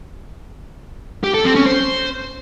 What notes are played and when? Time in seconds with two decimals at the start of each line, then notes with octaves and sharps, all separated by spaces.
1.24 G4
1.34 A4
1.45 C4
1.55 C#4
1.66 C5